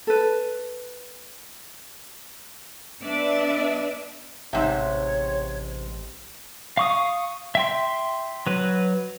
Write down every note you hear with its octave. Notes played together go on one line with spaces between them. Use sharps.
A4 B4
B3 D4 B4 D5 E5
A1 G#2 C3 C#5 E5
F5 C#6 D#6
E5 G5 C6
F#3 B4